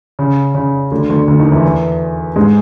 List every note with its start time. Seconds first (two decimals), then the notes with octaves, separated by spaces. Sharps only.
0.19 C#3
0.54 C#3
0.92 D2 D3
1.09 D2 D3
1.28 D2 D3
1.39 D#2 D#3
1.52 E2 E3
2.36 G#2 G#3